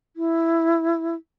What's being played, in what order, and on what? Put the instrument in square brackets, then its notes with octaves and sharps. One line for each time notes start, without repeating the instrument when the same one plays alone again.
[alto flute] E4